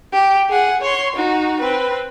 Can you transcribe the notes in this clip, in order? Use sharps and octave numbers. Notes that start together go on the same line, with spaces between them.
G4
G#4 F#5
C#5 C6
D#4 F#4
C4 B4